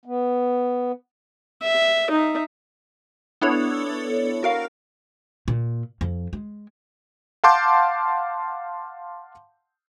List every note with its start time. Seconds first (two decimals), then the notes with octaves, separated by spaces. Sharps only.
0.06 B3
1.63 E5
2.11 D#4 E5
3.41 B3 D4 E4 A4 C#5
4.43 F#4 A#4 F5
5.48 A#2
6.01 F2
6.33 G#3
7.44 F5 F#5 A5 C6 D6 G6